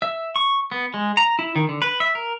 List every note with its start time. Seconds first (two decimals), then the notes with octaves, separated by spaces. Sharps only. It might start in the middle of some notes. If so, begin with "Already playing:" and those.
0.02 E5
0.36 C#6
0.71 B3
0.94 G#3
1.17 A#5
1.39 E4
1.56 D#3
1.69 D3
1.82 B4
2.00 E5
2.15 A#4